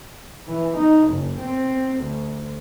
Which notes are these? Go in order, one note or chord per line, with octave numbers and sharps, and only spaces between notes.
E3
D#4
F#1
C4
D2